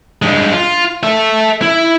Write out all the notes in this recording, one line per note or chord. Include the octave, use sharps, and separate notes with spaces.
G2 G#3
F4
A4 E5
E4